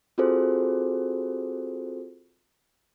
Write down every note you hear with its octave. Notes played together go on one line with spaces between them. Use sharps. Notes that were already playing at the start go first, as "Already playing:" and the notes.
C4 F4 F#4 G#4 A4 C5